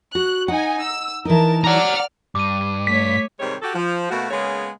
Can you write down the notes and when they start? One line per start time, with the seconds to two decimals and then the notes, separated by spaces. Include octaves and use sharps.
0.15 F#4 F#6
0.48 D#4 F#5 G#5
0.81 E6
1.25 E3 D#4 A#4 A5
1.64 D5 F#5 A#5 F6
2.35 G2 D6 D#7
2.87 A3 C#5 B6
3.39 G#2 C3 D#3 G3 G#3 C#5
3.61 F#4 G4 A4
3.74 F3
4.10 B2 A3 A#3 F#4
4.31 C#3 G#3 A#3 B3 C#4 C#5